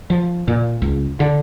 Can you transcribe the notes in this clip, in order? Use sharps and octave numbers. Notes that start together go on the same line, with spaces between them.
F3
A#2
C#2
D3